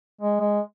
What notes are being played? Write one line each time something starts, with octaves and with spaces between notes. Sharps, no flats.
G#3
G#3